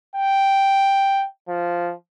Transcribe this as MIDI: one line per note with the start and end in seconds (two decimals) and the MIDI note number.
0.16 1.25 79
1.49 1.93 53